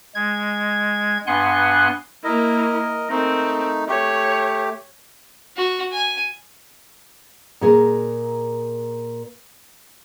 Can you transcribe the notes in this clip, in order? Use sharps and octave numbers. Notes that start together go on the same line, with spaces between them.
G#3 G#6
G2 B3 F#5 G#5 C6 F#6
A#3 E4 A#4 D#5
A3 C4 D#4 A#4
A3 G4 C#5
F#4
G#5
A#2 G#4 A#4